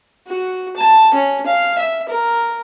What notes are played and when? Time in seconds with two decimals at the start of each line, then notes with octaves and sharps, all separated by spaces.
0.27 F#4
0.77 A5
1.14 C#4
1.46 F5
1.78 E5
2.08 A#4